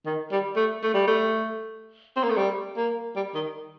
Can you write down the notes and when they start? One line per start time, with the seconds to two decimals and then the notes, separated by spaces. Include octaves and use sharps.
0.06 D#3
0.32 G3
0.56 A3
0.83 A3
0.94 G3
1.07 A3
2.16 C4
2.23 A#3
2.30 A3
2.37 G3
2.77 A#3
3.16 G3
3.35 D#3